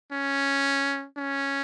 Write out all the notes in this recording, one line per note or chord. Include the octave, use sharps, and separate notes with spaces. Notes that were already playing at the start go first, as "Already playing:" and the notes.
C#4
C#4